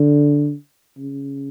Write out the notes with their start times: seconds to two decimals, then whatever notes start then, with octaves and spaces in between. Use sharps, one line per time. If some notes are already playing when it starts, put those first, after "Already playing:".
Already playing: D3
0.98 C#3